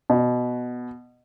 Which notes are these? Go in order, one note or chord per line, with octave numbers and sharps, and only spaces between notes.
B2